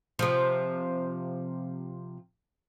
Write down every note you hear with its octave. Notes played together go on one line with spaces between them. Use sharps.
C3 F3